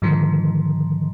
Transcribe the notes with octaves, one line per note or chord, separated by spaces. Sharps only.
G#2 D3 D#3 F3